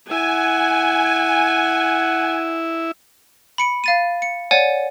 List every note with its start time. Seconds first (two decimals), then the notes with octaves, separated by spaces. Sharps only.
0.11 E4 F#5 G#5
3.58 B5 C#7 D7
3.84 F5 A6 D#7
4.22 C#7
4.51 C#5 D5 F#5 G#5